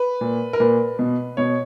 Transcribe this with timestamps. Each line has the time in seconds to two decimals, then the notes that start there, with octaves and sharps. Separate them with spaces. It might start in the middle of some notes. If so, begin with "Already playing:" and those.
Already playing: B4
0.21 A#2
0.53 A#4
0.60 A#2 B4
0.99 B2
1.37 B2 C#5